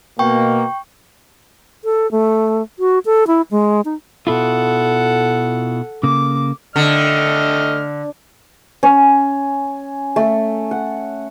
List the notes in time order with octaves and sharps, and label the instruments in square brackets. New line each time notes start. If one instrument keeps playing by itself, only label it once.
[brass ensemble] B2 A#3 [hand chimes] G5 C#6
[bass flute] A4
A3
F#4
A4
E4
G#3
D#4
[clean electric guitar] B2 E4 F4 [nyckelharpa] A4 F#5
[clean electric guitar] C#3 A#3 [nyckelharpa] D6
[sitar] D3 [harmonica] A3 D#5 F6
[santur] C#4
A3
F#5